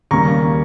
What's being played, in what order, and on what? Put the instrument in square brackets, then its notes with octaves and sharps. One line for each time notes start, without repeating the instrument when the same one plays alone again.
[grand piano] D#2 C#3 G3 A#3 A#5 C#6